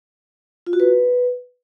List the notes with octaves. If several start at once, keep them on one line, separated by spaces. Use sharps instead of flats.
F4
F#4
B4